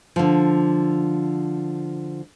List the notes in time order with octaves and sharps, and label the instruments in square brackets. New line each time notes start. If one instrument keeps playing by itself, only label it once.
[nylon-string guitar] D3 F3